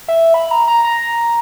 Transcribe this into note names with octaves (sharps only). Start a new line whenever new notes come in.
E5
B5
A#5
A#5
A#5